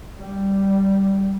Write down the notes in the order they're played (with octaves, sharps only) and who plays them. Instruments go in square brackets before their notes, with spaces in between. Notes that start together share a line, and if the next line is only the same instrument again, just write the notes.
[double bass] G3